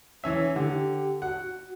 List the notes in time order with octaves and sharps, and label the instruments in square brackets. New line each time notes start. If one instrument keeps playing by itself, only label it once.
[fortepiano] E3 C#4 E5 [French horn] C#5
[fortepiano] D3 [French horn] G4
[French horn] F#4 [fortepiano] F#5